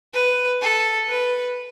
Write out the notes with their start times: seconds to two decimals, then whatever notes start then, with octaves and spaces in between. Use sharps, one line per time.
0.14 B4
0.62 A4
1.09 B4